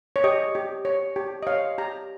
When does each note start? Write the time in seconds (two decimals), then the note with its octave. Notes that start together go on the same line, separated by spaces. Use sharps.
0.16 C#5
0.24 G4 D#5
0.55 G4
0.85 C#5
1.16 G4
1.43 D#5
1.47 C#5 F5
1.78 G4 A#5